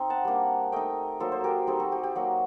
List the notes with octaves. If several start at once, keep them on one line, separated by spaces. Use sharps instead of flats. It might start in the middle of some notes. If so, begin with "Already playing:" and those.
Already playing: C4 D#4 C6
F#5 A5
G3 A#3 D4
A3 D#4 D#5 G5
F#3 A#3 D#4 A4 C5
C5
G4 A#4
G3 C4 D#4 A4 C5
F#4 A4
G4
G4
F#3 A#3 D#4 F#4